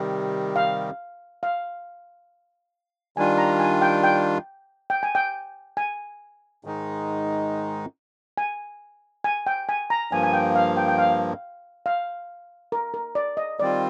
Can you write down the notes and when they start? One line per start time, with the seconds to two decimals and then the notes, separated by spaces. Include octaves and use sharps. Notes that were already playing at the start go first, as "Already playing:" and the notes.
Already playing: C3 D#3 G3
0.56 F5
1.43 F5
3.17 D#3 G3 D4 F4 G#5
3.38 A#5
3.60 G#5
3.82 G5
4.04 G5
4.90 G5
5.03 G#5
5.15 G5
5.77 G#5
6.64 G#2 D#3 G#3 D#4
8.38 G#5
9.24 G#5
9.47 G5
9.69 G#5
9.90 A#5
10.11 G2 F3 A#3 G#5
10.23 G#5
10.33 G5
10.55 F5
10.77 G5
10.88 G5
10.98 F5
11.86 F5
12.72 A#4
12.94 A#4
13.15 D5
13.37 D#5
13.60 D#3 G3 C4 F4 D5